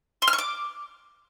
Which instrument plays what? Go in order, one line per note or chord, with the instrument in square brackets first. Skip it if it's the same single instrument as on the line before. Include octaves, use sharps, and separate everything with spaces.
[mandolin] C6
F6
C#6
D6